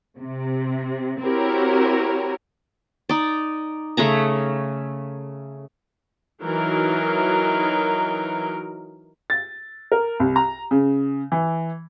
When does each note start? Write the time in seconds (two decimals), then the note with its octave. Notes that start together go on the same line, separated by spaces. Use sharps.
0.19 C3
1.21 C4 E4 F#4 G4 A#4 C#5
3.09 D#4 D5
3.97 C#3 A3 C#4 A#5
6.42 E3 F#3 D#4 A#4
9.30 A6
9.92 A#4
10.20 C2
10.36 A#5
10.71 C#3
11.32 E3